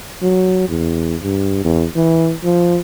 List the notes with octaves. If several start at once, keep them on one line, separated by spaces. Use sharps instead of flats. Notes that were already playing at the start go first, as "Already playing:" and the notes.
F#3
E2
G2
E2
E3
F3